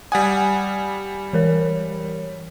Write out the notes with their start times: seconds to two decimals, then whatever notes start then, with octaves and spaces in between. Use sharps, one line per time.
0.12 G3 F#5 G#5 D#6
1.33 E3 A#4 C#5